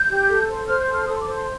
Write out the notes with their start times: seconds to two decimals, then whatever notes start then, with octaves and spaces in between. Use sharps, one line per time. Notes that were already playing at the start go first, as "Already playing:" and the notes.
Already playing: G6
0.09 G4
0.28 A4
0.48 C5
0.67 C5 F6
0.81 G6
0.88 A4
0.95 F6
1.07 A4 D#6
1.15 C6
1.21 D6
1.28 C5
1.34 C6